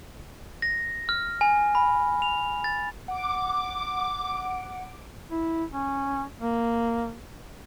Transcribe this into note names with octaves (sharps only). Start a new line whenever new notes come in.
A#6
F6
G#5
B5
F7
A6
F#5 D6
E4
C#4
A#3